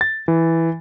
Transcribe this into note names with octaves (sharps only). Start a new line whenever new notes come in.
A6
E3